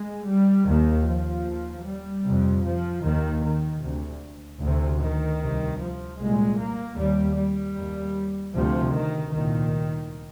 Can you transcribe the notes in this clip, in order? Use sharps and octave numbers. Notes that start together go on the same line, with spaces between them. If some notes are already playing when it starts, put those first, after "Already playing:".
Already playing: G#3
G3
D#2 D#3
F3
D#2
G3
F2 C3
F3
D#2 D#3
D#3
D2 C3
D2 C3
D#3
C2 C3
F3
C2 A#2 G#3
A#3
D#2 G3
G3
D#2
D2 C3 F3
D#3
C2 A#2 D#3